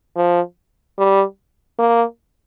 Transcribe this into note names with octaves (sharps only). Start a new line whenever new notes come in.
F3
G3
A#3